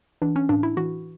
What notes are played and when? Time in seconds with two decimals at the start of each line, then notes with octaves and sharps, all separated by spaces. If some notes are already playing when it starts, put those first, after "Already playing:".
0.22 E3 D4
0.36 C#4
0.49 A2 D4
0.63 E4
0.77 E3 F#4